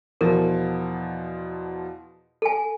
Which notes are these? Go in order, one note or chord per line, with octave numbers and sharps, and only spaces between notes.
E2 B2 F3 A#4
A4 G#5